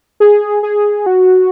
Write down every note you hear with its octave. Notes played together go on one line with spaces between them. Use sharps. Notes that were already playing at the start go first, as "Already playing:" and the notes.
G#4
G#4
F#4